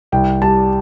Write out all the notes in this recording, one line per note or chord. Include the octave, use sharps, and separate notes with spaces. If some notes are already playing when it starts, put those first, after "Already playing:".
C2 G5
G3 A5